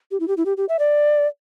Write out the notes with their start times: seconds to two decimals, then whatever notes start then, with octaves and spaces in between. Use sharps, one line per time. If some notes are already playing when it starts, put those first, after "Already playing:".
0.11 G4
0.20 E4
0.28 G4
0.37 E4
0.45 G4
0.57 G4
0.69 E5
0.79 D5